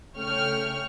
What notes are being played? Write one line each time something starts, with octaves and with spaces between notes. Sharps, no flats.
C#3 A3 C#5 G5 C#6 F6